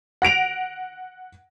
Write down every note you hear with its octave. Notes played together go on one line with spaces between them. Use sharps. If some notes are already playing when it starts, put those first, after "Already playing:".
F#5 A#6 D7 F7